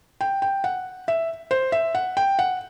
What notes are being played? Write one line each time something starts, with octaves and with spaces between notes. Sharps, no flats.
G5
G5
F#5
E5
C5
E5
F#5
G5
F#5